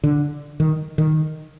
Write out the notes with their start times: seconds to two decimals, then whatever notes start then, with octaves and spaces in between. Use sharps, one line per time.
0.04 D3
0.60 D#3
0.98 D#3